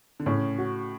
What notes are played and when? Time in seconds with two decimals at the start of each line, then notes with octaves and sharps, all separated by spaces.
0.20 D3
0.26 A2 C#3 C#4
0.58 F#4